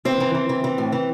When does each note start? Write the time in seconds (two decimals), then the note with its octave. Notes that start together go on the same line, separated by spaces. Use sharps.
0.05 E3 C4
0.20 E3
0.35 E3
0.49 E3
0.64 E3
0.78 A2
0.92 E3